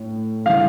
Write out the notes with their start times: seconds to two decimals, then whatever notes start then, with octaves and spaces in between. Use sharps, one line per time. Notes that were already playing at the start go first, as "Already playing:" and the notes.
Already playing: A2
0.46 C#3 E3 G3 F5